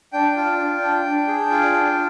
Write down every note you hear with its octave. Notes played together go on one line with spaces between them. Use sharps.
D4 G5
F4
D4
D4
D4
G#4
F4
D4